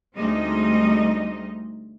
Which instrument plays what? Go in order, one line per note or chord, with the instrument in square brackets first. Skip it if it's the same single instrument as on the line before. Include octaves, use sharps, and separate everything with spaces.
[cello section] D2 G3 G#3 C4 D#4 D#5